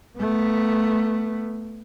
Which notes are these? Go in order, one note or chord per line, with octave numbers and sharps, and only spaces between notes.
A3 B3